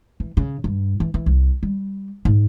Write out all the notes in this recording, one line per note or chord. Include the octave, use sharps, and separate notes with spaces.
E3
C#3
G2
E3
E3
C2
G3
G#2